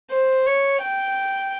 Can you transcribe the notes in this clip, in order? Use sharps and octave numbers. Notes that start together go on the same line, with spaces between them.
C5
C#5
G5